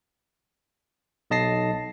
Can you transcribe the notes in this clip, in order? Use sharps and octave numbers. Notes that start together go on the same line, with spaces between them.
B1 D#5 A5 A#6 C7